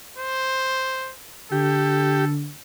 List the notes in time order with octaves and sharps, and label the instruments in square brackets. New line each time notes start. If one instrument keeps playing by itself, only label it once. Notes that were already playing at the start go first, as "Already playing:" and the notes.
[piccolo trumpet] C5
[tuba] D3 [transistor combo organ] G4 [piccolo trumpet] A4